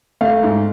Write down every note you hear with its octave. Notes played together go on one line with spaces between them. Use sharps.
A3 F5
G#2